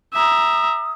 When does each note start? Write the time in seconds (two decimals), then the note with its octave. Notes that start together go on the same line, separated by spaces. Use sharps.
0.14 E5 A#5 D#6